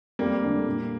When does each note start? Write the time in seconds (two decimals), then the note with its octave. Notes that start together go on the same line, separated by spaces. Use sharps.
0.19 F2 G3 A#3
0.43 D3 A3 D4
0.67 A#2